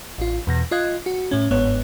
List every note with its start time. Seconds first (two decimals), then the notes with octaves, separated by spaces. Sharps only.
0.18 A1 F4
0.47 E2 B2 A#6
0.71 F4 D#5 F#6 G#6
1.06 F#4
1.31 A2 C#4
1.51 G1 G#2 B3 C#5